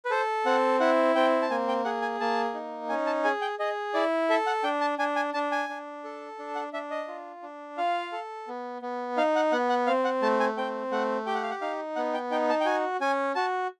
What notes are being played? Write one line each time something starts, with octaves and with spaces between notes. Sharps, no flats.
B4
A4 C5
C4 F#5
E4 F#5
C4 G5
A5
A#3 G#5
G5
G#4 F#5
G#5
A#3 A5
D#4
C#4 G#5
A5
G#4 G#5
G5
G#4 D#5
E4 D5
A4 E5
F#5
D4 G5
A5
D4 G#5
G#5
D4 A5
G#5
D4
A4
D4
F#5
D4 E5
D#5
F4
D4
F4 F5
A4
B3
B3
D#4 F5
F#5
B3 F#5
F#5
C4 F5
F#5
A3 A5
G#5
C4 G5
A3 F#5
G4 G5
F#5
F5
F#5
D#4 F5
B3 F#5
G5
D#4 G5
A5
G5
F#4 G#5
C#4 G#5
F#4 A5